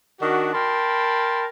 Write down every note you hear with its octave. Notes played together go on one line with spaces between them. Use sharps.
D#3 D4 F#4
A#4 G5 A5 B5 C6